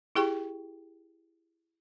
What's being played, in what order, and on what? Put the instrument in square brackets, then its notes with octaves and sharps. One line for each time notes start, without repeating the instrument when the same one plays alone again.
[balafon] E4 G4 G#4 G5 C#6